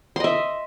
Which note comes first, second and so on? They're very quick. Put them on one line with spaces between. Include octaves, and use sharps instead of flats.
C6 D#5 E5